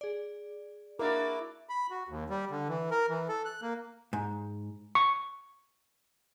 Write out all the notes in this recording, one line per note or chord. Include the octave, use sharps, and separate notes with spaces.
G#4 D5
A#3 D4 E4 F#4 A#4 D6
B5
F#4
D#2
G3
D3
E3
A#4
E3
A4
F#6
A#3
G#2
C#6